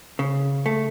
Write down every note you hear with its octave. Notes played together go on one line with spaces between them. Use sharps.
C#3
A3